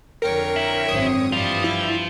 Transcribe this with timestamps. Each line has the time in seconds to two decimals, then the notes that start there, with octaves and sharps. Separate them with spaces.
0.22 F2 D3 A#4 C#5 G5
0.56 E4
0.89 G#1 F#2 C4 D#6
1.32 G2 E3 F3 G3
1.64 E4